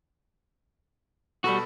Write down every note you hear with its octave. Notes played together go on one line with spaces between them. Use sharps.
B2 G3 F#4 A4 B5